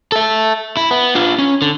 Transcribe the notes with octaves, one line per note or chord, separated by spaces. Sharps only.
A4 E5
E4
B3
D4 F4
C#4
D3